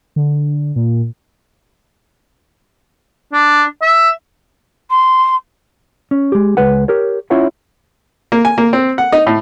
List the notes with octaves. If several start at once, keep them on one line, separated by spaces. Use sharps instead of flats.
D3
A#2
D4
E5
C6
C#4
G#3 G4
C#2 G#3 B4 F#5
G4 A#4 C#5
C#4 E4 F4 C#5 E5 F#5
A#3
G#5
A#3
C4
F#5
D#4
A2